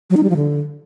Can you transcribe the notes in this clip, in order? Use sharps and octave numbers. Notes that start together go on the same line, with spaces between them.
F#3
D#4
G3
F3
D3